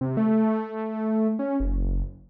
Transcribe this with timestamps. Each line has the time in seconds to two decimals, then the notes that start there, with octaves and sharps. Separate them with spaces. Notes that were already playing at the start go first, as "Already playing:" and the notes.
0.01 C3
0.17 A3
1.39 C#4
1.60 F#1